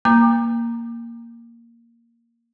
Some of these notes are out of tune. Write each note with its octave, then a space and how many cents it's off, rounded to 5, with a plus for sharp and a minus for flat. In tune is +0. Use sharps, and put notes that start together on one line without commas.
A#3 +0 A#5 +0 D6 +25